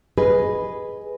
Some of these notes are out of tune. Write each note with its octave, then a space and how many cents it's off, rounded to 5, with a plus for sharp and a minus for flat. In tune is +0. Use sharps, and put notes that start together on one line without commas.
G#4 +0 B4 +0 D#5 +0